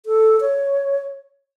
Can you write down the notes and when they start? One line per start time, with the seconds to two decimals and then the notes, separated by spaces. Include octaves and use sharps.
0.06 A4
0.41 C#5